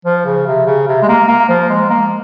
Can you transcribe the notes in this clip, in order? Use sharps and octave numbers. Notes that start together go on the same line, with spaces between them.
F3
C#3
C3
C#3
C3
G#3
A#3
A#3
F3
G#3
A#3